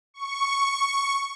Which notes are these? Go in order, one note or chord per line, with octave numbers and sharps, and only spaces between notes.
C#6